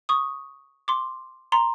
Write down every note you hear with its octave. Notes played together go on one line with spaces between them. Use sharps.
C#6 D#6
C6 D6
A#5 C6